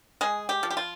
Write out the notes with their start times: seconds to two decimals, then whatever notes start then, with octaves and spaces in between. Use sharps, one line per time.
0.21 G#3 G#4
0.49 G4
0.63 F3
0.71 G4
0.77 F4